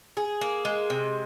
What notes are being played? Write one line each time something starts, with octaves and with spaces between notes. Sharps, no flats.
G#4
A#3
G#3
C3